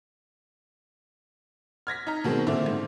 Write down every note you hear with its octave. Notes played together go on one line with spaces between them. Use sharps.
F6 G#6 A#6 B6
D#4 A#5
B2 D#3 G#3 C4
A#2 D3 C4 E4
G#2